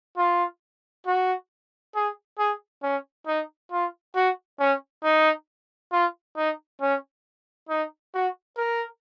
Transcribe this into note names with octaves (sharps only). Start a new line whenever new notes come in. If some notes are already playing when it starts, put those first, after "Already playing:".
F4
F#4
G#4
G#4
C#4
D#4
F4
F#4
C#4
D#4
F4
D#4
C#4
D#4
F#4
A#4